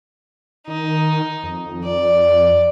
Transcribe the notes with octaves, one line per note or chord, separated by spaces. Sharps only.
D#3 D#4
F2
D5